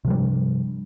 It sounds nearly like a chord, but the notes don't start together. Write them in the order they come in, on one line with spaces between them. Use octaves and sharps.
C3 F3 G3 G2